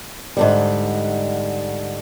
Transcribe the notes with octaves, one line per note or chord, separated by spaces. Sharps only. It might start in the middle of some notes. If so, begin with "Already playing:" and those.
G#2 D3 G3